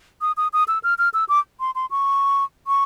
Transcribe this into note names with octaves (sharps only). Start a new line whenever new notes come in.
D#6
D#6
D#6
E6
F6
F6
E6
D6
C6
C6
C#6
C#6